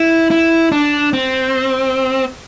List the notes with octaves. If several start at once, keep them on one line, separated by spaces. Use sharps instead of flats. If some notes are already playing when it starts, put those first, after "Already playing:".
Already playing: E4
E4
D4
C4